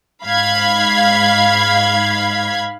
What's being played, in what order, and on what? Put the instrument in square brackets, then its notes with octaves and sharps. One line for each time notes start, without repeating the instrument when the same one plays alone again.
[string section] G#2 F5 B5 G#6